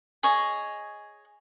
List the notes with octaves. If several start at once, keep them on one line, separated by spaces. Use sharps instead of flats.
G#4 C#5 D#5